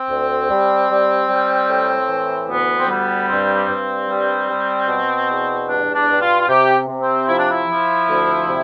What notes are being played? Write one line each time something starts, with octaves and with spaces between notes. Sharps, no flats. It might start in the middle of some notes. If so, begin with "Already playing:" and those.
Already playing: C4
D2
G3
G3
G3
A2
E3
D2 B3
C4
G3 B3
G2 C4
G2
G3
G3
B2
E2
G2 D4
D4
G2
F4
F4
C3 G4
C3
C4
F3 E4
D4
E4
F3
D2
C3